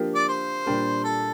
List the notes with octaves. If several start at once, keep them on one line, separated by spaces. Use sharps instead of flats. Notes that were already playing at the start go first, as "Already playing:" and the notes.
Already playing: F3 A#3 D4 G4 A#4
D5
C5
A#2 G3 D4 G4 A#4
A4